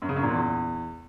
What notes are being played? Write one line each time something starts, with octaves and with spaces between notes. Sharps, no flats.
F#2
C#3
F#2
A#2
E2